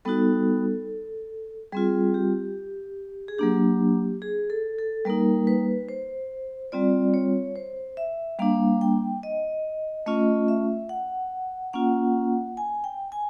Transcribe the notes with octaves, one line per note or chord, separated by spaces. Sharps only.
G3 B3 D#4 F#4 A4
G3 C4 F4 G#4
G4
G#4
F#3 A#3 D4 G4
G#4
A4
A4
G3 A#3 D#4 A#4
B4
C5
G3 C4 F4 D5
C#5
C5
E5
G3 A#3 D4 F5
G5
D#5
A3 C#4 F4 D#5
E5
F#5
A#3 C#4 F4 F#5
G#5
G5
G#5